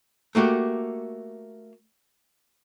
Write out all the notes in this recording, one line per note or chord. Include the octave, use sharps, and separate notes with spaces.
A3 A#3 F#4 G4